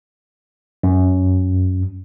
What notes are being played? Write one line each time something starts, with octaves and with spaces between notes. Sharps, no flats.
F#2